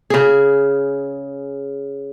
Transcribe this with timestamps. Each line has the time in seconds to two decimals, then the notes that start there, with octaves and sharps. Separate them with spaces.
0.10 C#3 G#4